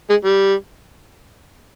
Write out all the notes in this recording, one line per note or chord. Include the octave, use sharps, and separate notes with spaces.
G#3
G3